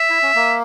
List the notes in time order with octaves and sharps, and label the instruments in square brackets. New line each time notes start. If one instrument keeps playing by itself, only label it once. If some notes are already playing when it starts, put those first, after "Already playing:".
Already playing: [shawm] E5
[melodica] E4
C#4
A#3